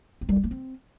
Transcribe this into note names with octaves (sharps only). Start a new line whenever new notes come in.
C4
G3
C4
A#3
C4